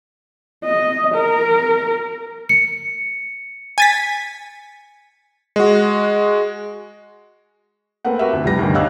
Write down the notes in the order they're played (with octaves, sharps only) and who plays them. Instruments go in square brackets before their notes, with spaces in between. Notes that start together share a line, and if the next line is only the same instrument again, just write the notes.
[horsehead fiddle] D#5
A#4
[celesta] C#7
[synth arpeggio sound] G#5 A6 B6
[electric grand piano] G#3 F#4
[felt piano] A3 A#3 C4 B4 F#5
F#4 G4 A#4 B4 E5 F#5
D2
F1 C2 B3 G4 A#6
D2 G2 D3 D#3
G4 C#5 D#5 F5 E6 F#6